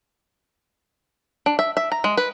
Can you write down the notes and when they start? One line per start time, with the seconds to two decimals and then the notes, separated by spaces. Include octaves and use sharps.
1.46 D4
1.59 E5
1.77 E5
1.92 A#5
2.04 G#3
2.17 B4